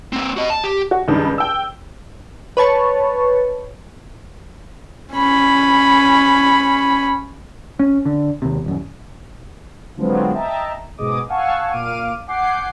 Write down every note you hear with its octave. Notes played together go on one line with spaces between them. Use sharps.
A#3 C4
F#4 D#5
A5
G4
F#4
C#2 G2 D#3
G5 E6
B4 C#5 A5 C#6
C#4 B5
C#4
D3
D#2 C3
D#1 F#2
D3 F3 F#3 G#3 B3 C4
D#5 E5 G5 A5 A#5
G#2 B2 G#4 D#5 D6 D#6
F5 F#5 G#5 A5 C#6 E6
A#2 F5 D6 F6 D7 D#7
F#5 G#5 D6 G6 C7